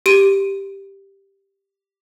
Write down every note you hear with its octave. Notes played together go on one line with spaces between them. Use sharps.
G4 D#7